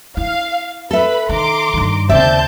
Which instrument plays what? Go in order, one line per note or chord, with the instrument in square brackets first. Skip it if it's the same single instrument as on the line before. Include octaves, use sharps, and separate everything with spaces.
[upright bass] E4 [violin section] F5
[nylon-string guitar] A4 E5 [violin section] B4 B5
[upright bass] D#3 [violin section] A#5 C6 D6
[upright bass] G2 D#3
[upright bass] D#2 C#3 [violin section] C4 A5 G6 [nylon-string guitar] D5 E5